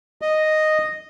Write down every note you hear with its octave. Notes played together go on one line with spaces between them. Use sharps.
D#5